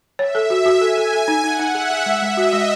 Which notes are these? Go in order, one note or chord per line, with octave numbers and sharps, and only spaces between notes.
C#5 E5
A4
F#4
F#4
A4 G#5
A4
A4 G#5
D#4
D#4 F#5
D#4
G#4 E5
G#4
G#3 E5
G#3
F#4 D#5
G#3